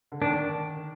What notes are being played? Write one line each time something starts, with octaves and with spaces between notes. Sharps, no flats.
D3
D#3 D4